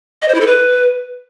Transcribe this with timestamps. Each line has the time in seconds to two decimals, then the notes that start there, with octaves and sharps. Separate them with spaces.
0.22 D#5
0.28 C5
0.34 E4
0.41 A4
0.47 B4